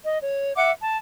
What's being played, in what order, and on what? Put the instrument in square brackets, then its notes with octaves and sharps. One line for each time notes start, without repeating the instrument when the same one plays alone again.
[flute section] D#5
C#5
E5 F#5 D6
A5